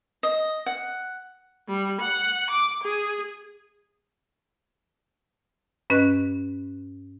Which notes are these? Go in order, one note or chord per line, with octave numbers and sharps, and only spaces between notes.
D#5
F#5
G3
F#5
D6
G#4
G2 C#4 B4 D#5 F#6